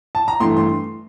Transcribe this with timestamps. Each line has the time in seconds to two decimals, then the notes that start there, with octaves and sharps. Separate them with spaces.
0.15 A5
0.28 A#5
0.40 G2 E3 A3 C6
0.57 C6